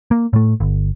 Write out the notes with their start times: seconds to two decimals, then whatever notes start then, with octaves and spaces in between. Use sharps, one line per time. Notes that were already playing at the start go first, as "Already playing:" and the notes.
0.11 A#3
0.33 A2 A3
0.60 G1